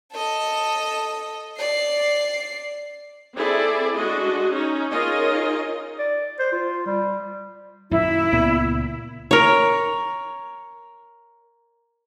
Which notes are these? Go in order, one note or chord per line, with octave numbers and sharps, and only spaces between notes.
A4 D#5
D5 C7
C4 E4 G#4 A4 D5
G#3 D4 F#4 D#5
C#4 D#4
D#4 F4 G#4 A#4 C#5 D#5
D5
C5
F4
G3
F#2 A#2 D#3 E4
C#2 A#2 B3
A#4 C#5